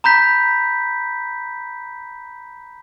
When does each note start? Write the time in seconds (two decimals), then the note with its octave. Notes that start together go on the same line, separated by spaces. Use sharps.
0.04 A#5 B5 G6 B6